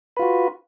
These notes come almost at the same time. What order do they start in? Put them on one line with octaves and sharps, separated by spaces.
B4 F4 F#4